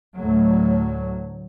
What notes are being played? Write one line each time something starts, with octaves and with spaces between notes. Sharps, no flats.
D2 A2 F#3